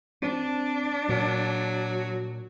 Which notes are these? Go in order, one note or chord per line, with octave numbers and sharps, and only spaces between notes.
C4 D4
A#2 F#3